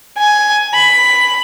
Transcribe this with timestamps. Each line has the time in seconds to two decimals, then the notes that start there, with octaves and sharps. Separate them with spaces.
0.17 G#5
0.74 B5